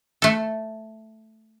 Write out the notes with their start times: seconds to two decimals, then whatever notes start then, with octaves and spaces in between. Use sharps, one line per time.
0.22 A3 A4